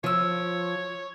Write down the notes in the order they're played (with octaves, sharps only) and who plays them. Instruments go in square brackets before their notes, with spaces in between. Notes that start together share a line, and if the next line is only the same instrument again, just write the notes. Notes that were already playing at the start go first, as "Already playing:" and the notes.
[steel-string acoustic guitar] F3 [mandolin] F4 E6 [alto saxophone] C#5